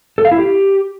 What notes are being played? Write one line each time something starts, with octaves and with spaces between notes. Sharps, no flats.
A4
F5
E4
G4